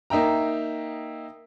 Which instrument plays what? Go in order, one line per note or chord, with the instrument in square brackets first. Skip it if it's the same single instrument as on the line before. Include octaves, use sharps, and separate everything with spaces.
[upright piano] A#3 D#4 E5 G5 A#5